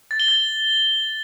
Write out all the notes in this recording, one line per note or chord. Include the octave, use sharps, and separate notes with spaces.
A6
G7
A6